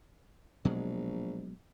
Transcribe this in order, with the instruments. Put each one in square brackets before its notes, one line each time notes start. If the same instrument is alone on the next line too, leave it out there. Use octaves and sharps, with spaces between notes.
[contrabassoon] A#1 [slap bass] B2 F#3 G#3